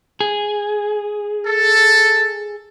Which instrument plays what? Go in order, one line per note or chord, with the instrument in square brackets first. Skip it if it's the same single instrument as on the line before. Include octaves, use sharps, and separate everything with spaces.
[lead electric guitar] G#4
[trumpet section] A4